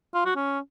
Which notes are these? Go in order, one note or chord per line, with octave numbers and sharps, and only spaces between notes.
F4
F#4
C#4